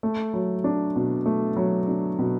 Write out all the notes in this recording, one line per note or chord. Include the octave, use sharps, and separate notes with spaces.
A3
F#3
D4
B2
A3
F#3
D4
B2